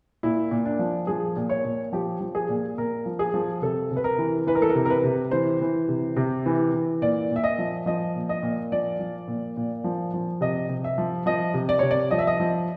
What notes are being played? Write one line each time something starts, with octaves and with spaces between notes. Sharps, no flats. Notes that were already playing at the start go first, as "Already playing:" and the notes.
A#2 E4
A#2
D4
F3
F3 G#4
A#2
C#5
A#2
F3 G4
F3
G#4
A#2
A#2 A#4
F3
G#4
F3
C3 A4
C3
B4
A#4
E3
E3 B4
A#4
A4
A#4
C3
A#4
B4
C3
E3 C5
E3
C3
C3
E3
E3
A#2 D5
A#2
E5
D#5
F3
F3 D#5
A#2
D#5
A#2
F3 D5
F3
A#2
A#2
F3
F3
C3 D#5
C3
E5
F3
F3 D#5
C3
D5
C3 C#5
D5
F3 D#5
E5
D#5
F3